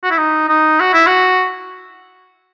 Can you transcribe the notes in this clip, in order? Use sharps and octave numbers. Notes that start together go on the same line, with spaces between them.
F#4
E4
D#4
D#4
F#4
E4
F#4